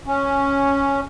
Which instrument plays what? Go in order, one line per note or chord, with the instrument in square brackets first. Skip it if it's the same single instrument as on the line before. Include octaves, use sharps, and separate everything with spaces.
[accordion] C#4